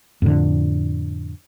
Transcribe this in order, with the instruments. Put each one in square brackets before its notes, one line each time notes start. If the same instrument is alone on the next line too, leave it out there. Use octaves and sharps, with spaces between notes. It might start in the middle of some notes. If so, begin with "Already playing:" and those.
[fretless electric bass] F2 A2 D3